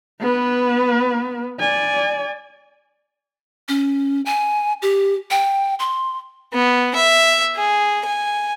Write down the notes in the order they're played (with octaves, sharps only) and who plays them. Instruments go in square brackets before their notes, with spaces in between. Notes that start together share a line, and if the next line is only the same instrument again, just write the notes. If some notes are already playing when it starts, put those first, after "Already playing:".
[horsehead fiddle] B3 B4
D5 G#5
[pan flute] C#4
G#5
G4
G5
C6
[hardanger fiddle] B3
E5
G#4
G#5